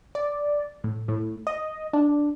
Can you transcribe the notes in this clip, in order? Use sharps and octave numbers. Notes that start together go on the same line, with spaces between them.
D5
A2
A2
D#5
D4